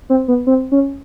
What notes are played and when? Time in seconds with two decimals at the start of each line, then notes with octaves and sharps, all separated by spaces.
0.10 C4
0.28 B3
0.47 C4
0.72 C#4